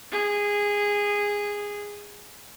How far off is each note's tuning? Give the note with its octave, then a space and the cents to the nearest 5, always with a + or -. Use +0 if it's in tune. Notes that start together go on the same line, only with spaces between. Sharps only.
G#4 -15